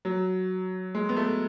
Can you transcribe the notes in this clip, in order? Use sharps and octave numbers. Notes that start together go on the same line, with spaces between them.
F#3
G#3
B3
A3